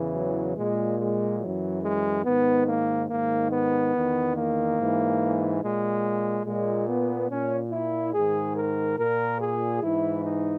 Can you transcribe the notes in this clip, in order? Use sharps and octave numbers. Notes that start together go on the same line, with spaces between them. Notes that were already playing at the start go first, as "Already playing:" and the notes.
Already playing: E2 C#3 E3
F#3
A#2 G#3
G#3
F#2 E3 F#3
G#3
G#2 D#3 B3
A#3
G#2 D#3 A#3
B3
E2 D#3
A#3
G#2 E3
A#2 G#3
A#2 G#3
B3
A#2 C#4
E4
G#2 D#3 G#4
A#4
A#2 A#4
G#4
G#2 E3 E4
D#4